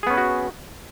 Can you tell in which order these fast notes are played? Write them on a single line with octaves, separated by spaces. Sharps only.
G#4 B3 C#4 B4 F#4